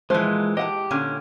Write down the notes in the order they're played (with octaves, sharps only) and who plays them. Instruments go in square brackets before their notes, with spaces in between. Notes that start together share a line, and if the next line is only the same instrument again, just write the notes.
[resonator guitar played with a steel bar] A#2 E3 [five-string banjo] F3 F4 C5 [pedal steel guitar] G#3
[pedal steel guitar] G4 [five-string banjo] D#5 F#5 A5
[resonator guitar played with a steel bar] A#2 D3 C#4